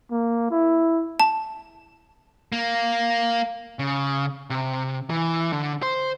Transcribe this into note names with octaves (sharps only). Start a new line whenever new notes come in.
A#3
E4
A5
A#3
C#3
C3
E3
D3
C5